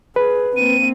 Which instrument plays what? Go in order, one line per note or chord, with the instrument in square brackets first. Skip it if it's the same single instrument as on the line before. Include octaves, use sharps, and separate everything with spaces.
[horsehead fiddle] G#4 [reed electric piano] B4
[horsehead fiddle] A#3 C4 [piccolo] D#7